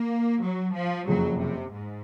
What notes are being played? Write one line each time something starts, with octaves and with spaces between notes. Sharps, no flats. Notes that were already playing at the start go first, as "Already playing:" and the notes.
Already playing: A#3
F#3
F3
F#1 F2 C#3 F#3
C3
G#2